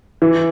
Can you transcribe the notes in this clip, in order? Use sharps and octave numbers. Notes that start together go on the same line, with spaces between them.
E3